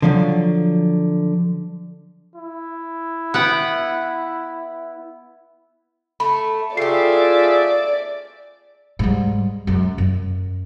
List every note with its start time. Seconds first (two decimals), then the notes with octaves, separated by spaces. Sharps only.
0.02 D3 F3 F#3
2.36 E4
3.34 B3 F#5 G5
6.20 A3 B5
6.77 A3 F4 G4 G#4 D5 E5 C7
8.99 G#2 G3
9.67 F#2 G#3
9.98 F#2